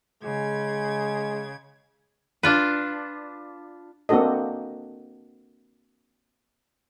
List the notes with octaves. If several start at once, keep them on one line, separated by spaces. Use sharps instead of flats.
C#3 G#3 G#6
D4 F4 B4
A#3 C4 D4 F#4 A4 D#5